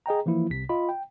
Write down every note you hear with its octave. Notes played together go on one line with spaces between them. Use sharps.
G#4 D#5 G5 A#5
E3 F3 A#3 E4
C2 C3 B6
F4 D#5 B5
G5